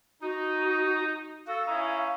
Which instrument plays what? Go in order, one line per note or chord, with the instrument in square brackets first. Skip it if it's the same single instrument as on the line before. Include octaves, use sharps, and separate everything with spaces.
[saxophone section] D#4 [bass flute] F#4
[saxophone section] F#4 A4 [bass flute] F5
[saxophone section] C#4 D#4 E4